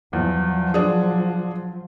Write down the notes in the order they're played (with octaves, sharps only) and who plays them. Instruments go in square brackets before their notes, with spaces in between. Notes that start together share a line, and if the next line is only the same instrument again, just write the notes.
[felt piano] E2 [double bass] F3 F#3
[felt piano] D4 G#4